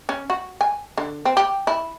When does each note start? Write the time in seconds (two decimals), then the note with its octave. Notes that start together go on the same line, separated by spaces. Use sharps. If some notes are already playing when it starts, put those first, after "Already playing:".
0.09 C#4
0.30 F#4
0.61 G#5
0.98 D3
1.25 C4
1.37 G4
1.67 E4